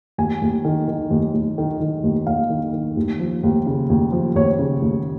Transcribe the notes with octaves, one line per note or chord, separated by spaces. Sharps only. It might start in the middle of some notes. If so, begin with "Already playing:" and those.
D#2 G#5
D#2
D#3
D#3
D#2
D#2
D#3
D#3
D#2
D#2 F5
D#3
D#3
D#2
F3
D#2
C#3
D#2
F3
D#2 C#5
C#3
D#2